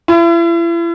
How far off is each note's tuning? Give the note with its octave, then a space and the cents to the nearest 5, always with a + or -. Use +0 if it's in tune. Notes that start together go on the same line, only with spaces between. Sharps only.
E4 +40